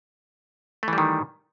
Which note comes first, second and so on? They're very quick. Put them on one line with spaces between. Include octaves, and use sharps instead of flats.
A3 E3 G3 D#3